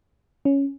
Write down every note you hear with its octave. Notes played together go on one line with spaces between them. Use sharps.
C#4